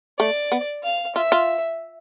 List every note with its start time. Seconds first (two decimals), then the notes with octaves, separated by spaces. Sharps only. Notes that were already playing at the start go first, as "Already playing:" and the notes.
0.19 A3 D5
0.52 B3
0.83 F5
1.15 F4 E5
1.32 F4